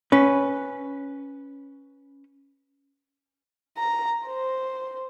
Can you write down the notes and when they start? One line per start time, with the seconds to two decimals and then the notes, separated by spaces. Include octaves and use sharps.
0.12 C#4 B4
3.78 A#5
4.27 C5